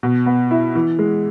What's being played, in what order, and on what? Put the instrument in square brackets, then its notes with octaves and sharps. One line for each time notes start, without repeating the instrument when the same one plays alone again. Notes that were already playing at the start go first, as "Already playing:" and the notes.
[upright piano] B2
B3
E4
E3
G#3